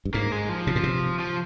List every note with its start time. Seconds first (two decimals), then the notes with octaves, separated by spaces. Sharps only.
0.05 G2
0.14 G#2 A#3
0.32 G#3
0.49 F3
0.67 C3
0.76 A#2
0.83 C3
1.19 F3